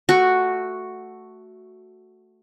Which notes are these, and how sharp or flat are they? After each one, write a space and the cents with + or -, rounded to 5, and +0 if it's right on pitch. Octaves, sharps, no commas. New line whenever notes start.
A3 +0 F#4 +0